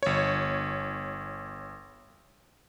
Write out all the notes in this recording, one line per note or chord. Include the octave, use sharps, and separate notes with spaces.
G1 C#5